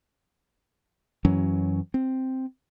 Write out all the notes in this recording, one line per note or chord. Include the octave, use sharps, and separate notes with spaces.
F#2 E3 F#3 C#4
C4